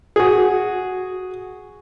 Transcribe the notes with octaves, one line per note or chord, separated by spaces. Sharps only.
F#4 G#4